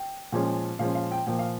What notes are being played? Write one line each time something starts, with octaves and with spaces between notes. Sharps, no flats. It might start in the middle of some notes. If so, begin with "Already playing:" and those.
Already playing: G5
A#2 F3 G#3 C#4
A#2 F3 G#3 C#4 F5
F5
G5
A#2 F3 A#3 G5
F5